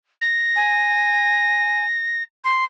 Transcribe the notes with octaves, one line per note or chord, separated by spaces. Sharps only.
A#6
G#5
C6